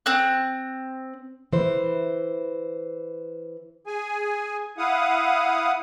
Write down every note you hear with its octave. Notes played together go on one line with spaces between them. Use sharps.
C4 F#6
E3 C5
G#4 G#5
E4 F5 F#5 D#6